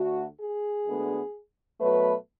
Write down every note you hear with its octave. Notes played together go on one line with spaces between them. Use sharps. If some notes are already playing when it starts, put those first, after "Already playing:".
Already playing: D2 D3 A3 F#4
G#4
D2 D3 G#3 B3
B2 F#3 A3 B4